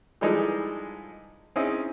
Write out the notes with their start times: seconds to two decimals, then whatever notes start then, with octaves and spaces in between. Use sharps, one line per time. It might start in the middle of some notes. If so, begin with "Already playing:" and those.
0.21 E3 F3 G3 G#3 D#4 A4
1.56 C4 C#4 D#4 E4 G#4